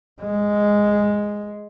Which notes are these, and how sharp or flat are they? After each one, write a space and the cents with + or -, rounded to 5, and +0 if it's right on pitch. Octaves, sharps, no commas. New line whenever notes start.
G#3 -5